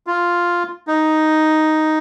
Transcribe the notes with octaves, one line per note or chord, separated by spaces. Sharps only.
F4
D#4